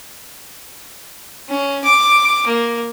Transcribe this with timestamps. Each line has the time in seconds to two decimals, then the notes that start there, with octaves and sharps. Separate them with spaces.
1.48 C#4
1.84 D6
2.47 A#3